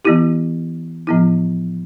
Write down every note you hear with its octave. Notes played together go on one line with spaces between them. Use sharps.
E3 B3 E4 G4
A2 F3 B3 E4